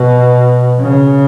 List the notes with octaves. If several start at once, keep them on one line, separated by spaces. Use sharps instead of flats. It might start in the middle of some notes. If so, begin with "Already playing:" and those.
Already playing: B2
C#3